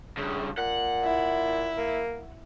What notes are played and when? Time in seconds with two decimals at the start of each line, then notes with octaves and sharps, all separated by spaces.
0.17 G2 C#3
0.58 A#2 F#5
1.04 E4
1.77 A#3